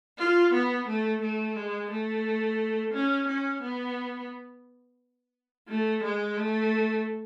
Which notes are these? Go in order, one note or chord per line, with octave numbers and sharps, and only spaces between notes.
F4
B3
A3
A3
G#3
A3
C#4
C#4
B3
A3
G#3
A3